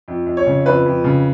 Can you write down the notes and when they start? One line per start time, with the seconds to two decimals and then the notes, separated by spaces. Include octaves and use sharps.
0.08 F2
0.26 F2
0.37 C#5
0.46 C#3
0.66 F2 B4
0.86 F2
1.04 C#3